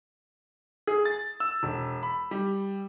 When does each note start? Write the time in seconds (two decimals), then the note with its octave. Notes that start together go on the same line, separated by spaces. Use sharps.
0.87 G#4
1.05 A6
1.40 E6
1.63 E1
2.03 B5
2.31 G3